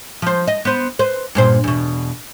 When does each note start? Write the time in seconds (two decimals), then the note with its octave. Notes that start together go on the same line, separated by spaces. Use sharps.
0.22 F3 C5
0.47 D#5
0.65 B3 C5
0.99 B4 C5
1.35 G2 A#2 C5
1.64 E2 B2